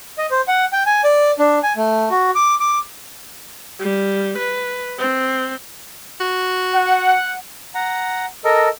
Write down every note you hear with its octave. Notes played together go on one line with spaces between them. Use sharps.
D#5
C5
F#5
G5
G#5
D5
D4
G#5
A3
F#4
D6
D6
G3
B4
C4
F#4
F#5
F#5 A#5
A4 A#4 D#5